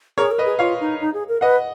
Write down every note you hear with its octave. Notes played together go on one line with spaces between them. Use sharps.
G#4 A#4 C#5
A#4
B4 D#5
G#4
F4 C#5 F5
D#4
D#4
G#4
A#4
B4 D#5 F#5